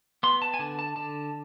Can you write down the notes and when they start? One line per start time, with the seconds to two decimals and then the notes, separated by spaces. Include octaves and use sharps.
0.23 B3 C6
0.42 A5
0.54 G#5
0.59 D3 A5
0.79 A5
0.96 D3 A5